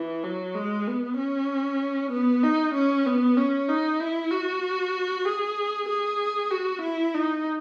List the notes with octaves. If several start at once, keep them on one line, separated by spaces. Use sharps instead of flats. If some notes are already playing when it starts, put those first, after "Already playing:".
Already playing: E3
F#3
G#3
B3
C#4
B3
D#4
C#4
B3
C#4
D#4
E4
F#4
G#4
G#4
F#4
E4
D#4